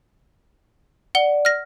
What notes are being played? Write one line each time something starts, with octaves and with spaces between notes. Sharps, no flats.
D5 F#5 G7
F6 A#6